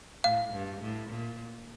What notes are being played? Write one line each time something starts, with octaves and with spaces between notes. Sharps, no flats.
A2 F5
G2
A2
A#2